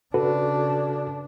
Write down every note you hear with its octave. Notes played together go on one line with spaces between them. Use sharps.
C#3 D4 F#4 A4 B4